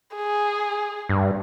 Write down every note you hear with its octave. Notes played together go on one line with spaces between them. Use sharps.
G#4
G2